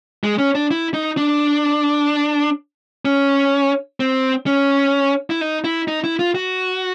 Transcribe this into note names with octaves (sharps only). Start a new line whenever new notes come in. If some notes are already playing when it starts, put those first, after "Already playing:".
G#3
C#4
D4
E4
D#4
D4
C#4
C4
C#4
E4
D#4
E4
D#4
E4
F4
F#4